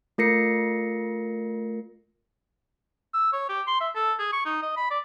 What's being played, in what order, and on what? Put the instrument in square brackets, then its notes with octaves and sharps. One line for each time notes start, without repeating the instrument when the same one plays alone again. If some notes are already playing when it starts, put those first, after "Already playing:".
[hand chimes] A3 F4 A#4 A#6 C7 C#7
[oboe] E6
C#5
G4
C6
E5
A4
G#4
C#6
D#4
D#5
B5
D5